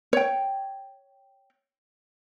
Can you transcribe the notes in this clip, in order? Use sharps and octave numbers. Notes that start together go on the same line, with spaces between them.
C#5 G5